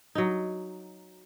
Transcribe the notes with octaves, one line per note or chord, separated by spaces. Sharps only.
F#3 D#4